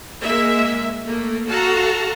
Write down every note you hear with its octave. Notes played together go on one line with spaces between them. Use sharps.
G#3 A#3 E5
A3 A#3
F#4 A4 F5 A5 A#5